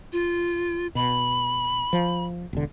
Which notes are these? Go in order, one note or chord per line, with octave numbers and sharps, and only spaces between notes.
F4
B2 B5
F3
E1 D3